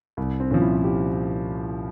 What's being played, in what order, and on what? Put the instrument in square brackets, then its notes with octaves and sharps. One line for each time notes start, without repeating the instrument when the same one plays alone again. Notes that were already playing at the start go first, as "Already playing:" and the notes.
[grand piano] C2
C4
A#2 F3 C#4
E4
F4
G4